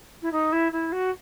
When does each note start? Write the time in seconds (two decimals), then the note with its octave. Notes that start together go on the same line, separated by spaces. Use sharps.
0.22 E4
0.32 D#4
0.52 E4
0.72 E4
0.92 F#4